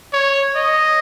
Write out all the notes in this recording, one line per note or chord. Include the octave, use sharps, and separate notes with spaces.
C#5
D#5